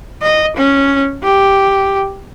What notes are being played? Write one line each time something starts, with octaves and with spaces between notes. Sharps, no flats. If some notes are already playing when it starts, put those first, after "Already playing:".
D#5
C#4
G4